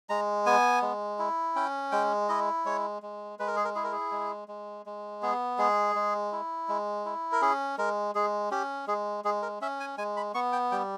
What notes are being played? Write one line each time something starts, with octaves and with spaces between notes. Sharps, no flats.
G#3 A#5
B3 G#5
G#3
E4
C#4 G5
G#3 G5
E4 D#5
G#3 C#5
G#3
G#3 B4
A#4
G#4
A#4
E4 G#4
A#4
G#4
G#3
G#3
G#3
B3 G#4
G#3 G#4
G#3
E4
G#3
E4
A#4
C#4 G#4
G#3 A#4
G#3 G#4
C#4 G4
G#3 G#4
G#3 G#4
A#4
C#4 E5
G#5
G#3 G#5
B5
B3 C#6
G5
G3 G5